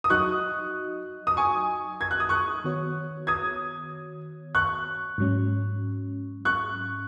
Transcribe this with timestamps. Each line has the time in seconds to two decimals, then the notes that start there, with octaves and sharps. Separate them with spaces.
0.04 D#6
0.10 F#3 D#4 F#4 D#5 C#6 F#6
1.27 D#6
1.37 G#5 C#6
2.01 G#6
2.11 F#6
2.20 D#6
2.29 C#6 F#6
2.64 D#3 B3 F#4 C#5
3.27 D#6 G#6
4.55 C#6 F#6
5.18 G#2 F#3 C#4
6.45 C#6 F#6